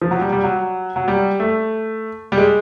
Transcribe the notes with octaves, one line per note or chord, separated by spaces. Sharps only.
F3
F#3
G3
G3
F#3
F#3
G3
A3
G3
G#3